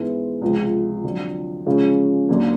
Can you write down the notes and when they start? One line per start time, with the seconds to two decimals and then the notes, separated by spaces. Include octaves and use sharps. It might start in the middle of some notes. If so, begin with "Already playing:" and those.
Already playing: G#2 E3 G#3 B3 E4
0.42 C#2 C3 F3 G#3
1.04 F2 D3 F#3
1.66 C#3 F3 G#3 C#4
2.29 D#2 D3 F#3 A#3